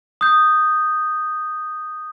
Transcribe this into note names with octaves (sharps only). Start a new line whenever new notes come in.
D#6 G6